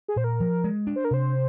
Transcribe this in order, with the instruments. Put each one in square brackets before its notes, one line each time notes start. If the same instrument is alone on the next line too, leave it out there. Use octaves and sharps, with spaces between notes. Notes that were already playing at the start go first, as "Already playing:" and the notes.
[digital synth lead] G#4
[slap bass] A#2 [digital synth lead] C5
[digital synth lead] A#4
[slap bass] F3
G#3
D4
[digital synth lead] C5
A#4
[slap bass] C3 [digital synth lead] C5